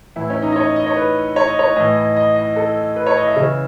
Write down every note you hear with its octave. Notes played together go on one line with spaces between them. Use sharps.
A2 E3 E4
C#4
D#4
D#5
C#5
D#5
C#5
B4
C#5
D#5
C#5
A2 E3 D#5
D#5
D#5
D#5
A4
B4
C#5
D#5
E5
C#3 E3